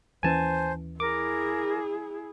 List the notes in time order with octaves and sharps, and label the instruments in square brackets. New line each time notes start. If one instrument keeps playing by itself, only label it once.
[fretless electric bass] D#2 E3 C#4 [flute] C5 [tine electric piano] G#5 A5
[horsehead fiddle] E4 G#4 [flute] A#4 [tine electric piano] D6